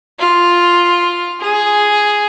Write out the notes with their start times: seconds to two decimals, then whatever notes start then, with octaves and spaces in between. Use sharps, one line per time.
0.19 F4
1.41 G#4